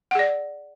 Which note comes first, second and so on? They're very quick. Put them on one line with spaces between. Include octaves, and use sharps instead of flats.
F#5 G#4 D5